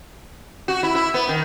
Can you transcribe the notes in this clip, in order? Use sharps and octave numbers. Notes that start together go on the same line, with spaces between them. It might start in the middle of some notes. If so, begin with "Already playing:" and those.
F#4
E4
E4
B3
D#3